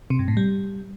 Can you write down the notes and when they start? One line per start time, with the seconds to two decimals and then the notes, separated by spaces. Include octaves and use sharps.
0.10 C3
0.19 G2
0.28 A2
0.37 G3